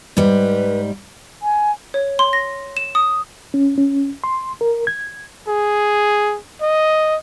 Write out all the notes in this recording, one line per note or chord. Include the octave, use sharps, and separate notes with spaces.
G#2 G3 B4
G#5
C#5
C6
A#6
E7
D#6
C#4
C#4
C6
A#4
G#6
G#4
D#5